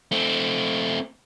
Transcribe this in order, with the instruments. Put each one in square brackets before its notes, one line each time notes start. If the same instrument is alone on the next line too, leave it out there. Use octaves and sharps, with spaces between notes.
[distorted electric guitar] A3 C4